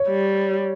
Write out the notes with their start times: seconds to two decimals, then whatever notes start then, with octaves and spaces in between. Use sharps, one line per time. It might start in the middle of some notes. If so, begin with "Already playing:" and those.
Already playing: C#5
0.08 G3